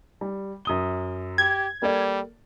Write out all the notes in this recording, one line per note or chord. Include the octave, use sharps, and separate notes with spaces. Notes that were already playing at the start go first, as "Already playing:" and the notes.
G3
F#2 D#6 G7
G4 G#6
G3 A#3 A4 D5